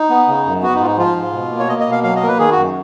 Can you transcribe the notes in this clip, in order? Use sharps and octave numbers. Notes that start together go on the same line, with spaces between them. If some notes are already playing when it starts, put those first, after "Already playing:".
Already playing: D#4
B3
C#3
F#2
B3 F#4
D#4
G#2 F4
D#4
F3 F4
G#2
B2
A#3
C#5
A#3 D#5
D#5
B2
F5
F#3 F5
D#5
A#3 A#4
B4
D#3 G#4
F#4
F#2